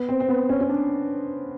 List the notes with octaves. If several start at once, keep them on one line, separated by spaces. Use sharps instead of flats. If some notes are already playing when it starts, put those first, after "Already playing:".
Already playing: B3
C4
C4
B3
C#4
C#4
D4